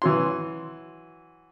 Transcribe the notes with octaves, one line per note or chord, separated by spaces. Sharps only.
E3 F#3 C6